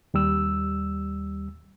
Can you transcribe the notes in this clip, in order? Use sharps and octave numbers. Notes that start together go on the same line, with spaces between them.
D#2 G3 E6